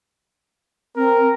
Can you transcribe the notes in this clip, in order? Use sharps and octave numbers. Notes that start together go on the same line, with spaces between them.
C4 A#4